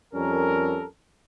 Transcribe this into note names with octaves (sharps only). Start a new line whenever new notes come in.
F2 G3 C#4 A4 A#4